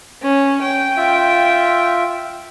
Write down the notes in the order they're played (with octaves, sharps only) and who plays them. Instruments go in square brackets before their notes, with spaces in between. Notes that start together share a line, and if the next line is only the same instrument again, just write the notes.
[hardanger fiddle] C#4
G5
[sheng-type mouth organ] F4 E5